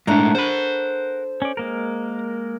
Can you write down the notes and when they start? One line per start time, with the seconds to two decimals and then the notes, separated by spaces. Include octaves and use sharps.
0.07 A2 G#3 A3 D4 A#4 F#5 A#5
0.35 A4 C5 B5
1.42 C#4 D5
1.57 G#3 A#3 A#4